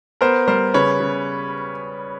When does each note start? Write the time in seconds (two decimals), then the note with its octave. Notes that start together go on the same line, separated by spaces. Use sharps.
0.21 B3 A#4 C5
0.48 G3 A#4 C5
0.74 C#3 B4 C#5
1.00 C#3